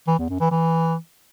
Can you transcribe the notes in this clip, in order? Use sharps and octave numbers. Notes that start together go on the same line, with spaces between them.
E3
E2
F#2
E3
E3